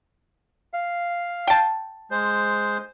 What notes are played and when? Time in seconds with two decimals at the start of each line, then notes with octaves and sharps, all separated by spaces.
0.74 F5
1.47 G5 A5
2.11 G#3 C5